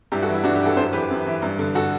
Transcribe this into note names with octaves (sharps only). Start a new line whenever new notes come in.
G2 E4 G4
F#4 A4
E3
E4
G2 D4 F#4
E4 G4
E3
F#4 A4
F#2 A4 C5
E3 G4 B4
F#2
E3
G2
D3
F#4 A4